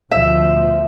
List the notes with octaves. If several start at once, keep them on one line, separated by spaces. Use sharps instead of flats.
D2 B2 F3 E5